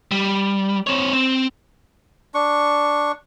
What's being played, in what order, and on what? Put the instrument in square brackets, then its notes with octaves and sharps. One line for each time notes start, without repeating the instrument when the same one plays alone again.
[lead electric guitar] G3
C4 C#5
C4
[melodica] D4 C#6